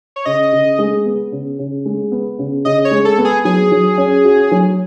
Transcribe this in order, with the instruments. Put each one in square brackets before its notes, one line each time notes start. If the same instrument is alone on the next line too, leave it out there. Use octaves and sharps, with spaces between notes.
[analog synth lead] C#5
[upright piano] C#3 [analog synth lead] D#5
[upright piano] C#3
G#3
B3
C#3
C#3
G#3
B3
C#3
[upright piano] C#3 [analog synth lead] D#5
[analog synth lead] C#5
[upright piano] G#3
[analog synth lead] A4
[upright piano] B3
[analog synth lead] G#4
[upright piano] F#3 [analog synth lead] G#4
[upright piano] F#3
C#4
F#4
F#3